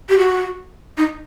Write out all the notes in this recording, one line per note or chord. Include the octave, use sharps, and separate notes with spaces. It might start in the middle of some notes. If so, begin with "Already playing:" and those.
G4
F#4
D#4